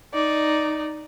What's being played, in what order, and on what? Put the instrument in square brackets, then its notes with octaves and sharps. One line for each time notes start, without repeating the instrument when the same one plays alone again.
[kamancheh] D#4 D5